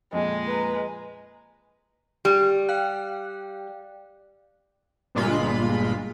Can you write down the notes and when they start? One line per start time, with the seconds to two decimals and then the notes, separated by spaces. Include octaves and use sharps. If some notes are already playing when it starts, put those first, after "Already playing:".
0.13 F2 A#2 G#3 D#5
0.47 B4 A#5
2.25 G3 G4
2.69 F5 G5 F#6
5.15 G1 G2 A#2 G#3 F4 B5